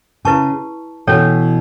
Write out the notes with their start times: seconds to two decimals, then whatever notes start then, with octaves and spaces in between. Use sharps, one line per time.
0.25 C#3 E4 B4 A5 C#6
1.07 B2 E3 C#4 A4 C#5